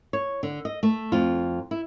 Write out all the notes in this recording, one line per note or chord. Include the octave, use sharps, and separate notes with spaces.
C#5
D3
D#5
A3
F2 F4
E4